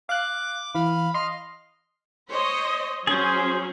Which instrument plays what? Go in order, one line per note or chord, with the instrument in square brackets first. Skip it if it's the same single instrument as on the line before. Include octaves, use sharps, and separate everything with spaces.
[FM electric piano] F5 F#6 [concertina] D6
[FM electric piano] E3 [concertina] F5 B5
[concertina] D#5 F6 [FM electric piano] C6
[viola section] C5 C#5 D#5
[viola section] F#3 C#4 [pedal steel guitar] G#4 C5